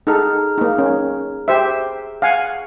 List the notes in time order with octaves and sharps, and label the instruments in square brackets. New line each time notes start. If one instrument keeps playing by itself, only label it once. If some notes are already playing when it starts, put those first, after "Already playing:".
[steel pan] D#4 A4 [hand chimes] G#4 A#5 F6
[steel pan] A#3 D#4
C#4
G4 C5 E5
F5 F#5 G#5